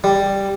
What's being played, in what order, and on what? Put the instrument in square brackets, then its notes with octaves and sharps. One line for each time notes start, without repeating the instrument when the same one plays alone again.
[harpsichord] G3